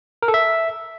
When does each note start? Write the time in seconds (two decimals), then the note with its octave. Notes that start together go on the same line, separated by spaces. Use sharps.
0.22 A#4
0.28 A4
0.34 E5